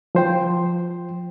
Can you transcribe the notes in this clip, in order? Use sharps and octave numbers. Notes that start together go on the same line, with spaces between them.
F3 C5 G5